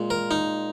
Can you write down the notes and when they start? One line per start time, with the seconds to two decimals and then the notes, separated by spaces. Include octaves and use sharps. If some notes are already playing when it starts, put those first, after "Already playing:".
Already playing: A#2 G#3
0.10 A#4
0.31 D#4